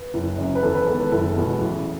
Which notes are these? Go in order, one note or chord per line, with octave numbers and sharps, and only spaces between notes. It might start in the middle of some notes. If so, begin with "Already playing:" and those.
Already playing: B4
F#1
F#2 C#3
B4
E2 A4
B4
D#3 G#3 B3 A4
B4
F#1 A4
E2 B2 G#3 B3
A1